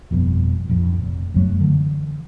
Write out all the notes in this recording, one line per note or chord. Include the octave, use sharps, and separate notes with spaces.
G1 F2 B2
A#1 F2
F1
F1 F#2 F#3 A3
D3 E3